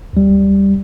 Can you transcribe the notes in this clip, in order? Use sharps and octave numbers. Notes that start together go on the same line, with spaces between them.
D2 G3